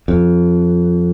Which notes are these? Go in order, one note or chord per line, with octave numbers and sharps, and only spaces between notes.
F2